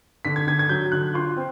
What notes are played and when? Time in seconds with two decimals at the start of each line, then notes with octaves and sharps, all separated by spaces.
0.25 D3 B6
0.36 G#6
0.47 D3 G#6
0.59 G#6
0.69 F#3 G6
0.92 D3 F#6
1.14 F4 C6
1.36 C4